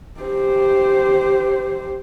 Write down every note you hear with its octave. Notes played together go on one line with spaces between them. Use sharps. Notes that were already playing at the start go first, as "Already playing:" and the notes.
G4 C5